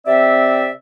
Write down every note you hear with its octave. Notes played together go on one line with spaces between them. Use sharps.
C3 C4 D5 E5